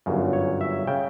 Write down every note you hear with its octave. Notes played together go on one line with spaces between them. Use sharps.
G1 F#2 C#3
C#5
E5
C#3 G5